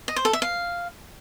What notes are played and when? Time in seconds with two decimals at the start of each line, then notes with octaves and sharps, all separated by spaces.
0.08 D#5
0.16 C5
0.25 A4
0.33 E5
0.42 F5